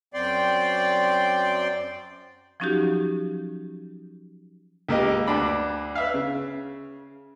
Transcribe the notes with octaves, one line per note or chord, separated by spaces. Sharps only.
F#2 C4 D5 G5 C6
F3 F#3 C#4 D#4 F#4 G4
C#2 A#3 G4 D#5
D2 D4 B5 D6
B4 E5 F5
C#3